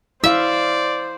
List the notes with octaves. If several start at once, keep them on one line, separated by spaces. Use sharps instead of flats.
E4 C5 D5 E5 F5